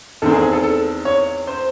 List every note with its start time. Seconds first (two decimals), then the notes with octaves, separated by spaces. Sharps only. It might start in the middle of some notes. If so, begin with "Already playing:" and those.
0.22 E2 D#3 A3 C4 A4
0.32 G#4
0.42 G#4
0.53 A4
0.63 A4
1.05 C#5
1.47 C5